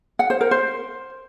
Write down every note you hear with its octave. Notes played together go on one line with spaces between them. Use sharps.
F#5
C5
A#4
C5